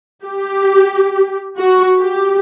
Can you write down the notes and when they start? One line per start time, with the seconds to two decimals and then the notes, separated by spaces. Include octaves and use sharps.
0.24 G4
1.58 F#4
1.99 G4